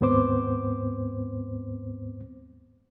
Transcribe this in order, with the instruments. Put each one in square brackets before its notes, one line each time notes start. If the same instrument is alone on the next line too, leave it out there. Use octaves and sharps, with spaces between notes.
[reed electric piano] D#2 G#2 B3 C4 C5 D6